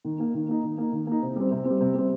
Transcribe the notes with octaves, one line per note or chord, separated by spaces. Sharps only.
D#3
A#3 D#4
D#3
A#3 D#4
D#3
A#3 D#4
D#3
A#3 D#4
C3
G3 C4
C3
G3 C4
C3
G3 C4